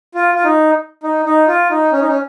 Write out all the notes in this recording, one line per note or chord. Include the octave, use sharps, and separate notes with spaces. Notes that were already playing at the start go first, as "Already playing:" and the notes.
F4
F4
D#4
D#4
D#4
F4
D#4
C#4
D#4
C#4